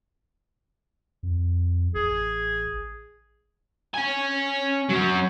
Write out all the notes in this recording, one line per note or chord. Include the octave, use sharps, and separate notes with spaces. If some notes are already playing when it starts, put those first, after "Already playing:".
F2
A1 G#4
C#4 G#5
F#3 C#4